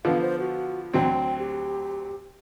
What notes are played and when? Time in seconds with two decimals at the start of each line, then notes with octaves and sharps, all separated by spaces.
0.05 D3 F3 B3 F5
0.21 C5
0.40 F#4
0.94 D2 F#3 C4 G5
1.39 G4